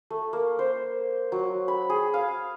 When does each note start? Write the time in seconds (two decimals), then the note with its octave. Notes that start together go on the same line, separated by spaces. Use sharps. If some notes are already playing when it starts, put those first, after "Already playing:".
0.10 A3
0.33 A#3
0.59 C5
1.32 F#3
1.68 B5
1.90 G#4
2.14 F5